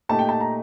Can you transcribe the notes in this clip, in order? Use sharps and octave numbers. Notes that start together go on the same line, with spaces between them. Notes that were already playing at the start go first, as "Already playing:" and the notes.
A#2 A3 D#4 G4 A5
G5
A5
A#5